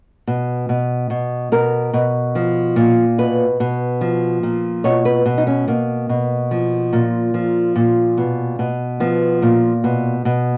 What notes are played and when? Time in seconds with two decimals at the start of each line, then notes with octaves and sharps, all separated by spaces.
0.27 B2
0.69 B2
1.10 B2
1.52 B2 A#4
1.93 B2
2.35 F3
2.76 A#2
3.18 B2 B4
3.60 B2
4.01 F3
4.43 A#2
4.84 B2 C#5
5.05 B4
5.26 B2
5.38 D#4
5.47 C#4
5.68 B2 A#3
6.09 B2
6.51 F3
6.93 A#2
7.34 F3
7.76 A#2
8.18 B2
8.59 B2
9.00 F3 B3
9.42 A#2
9.84 B2
10.25 B2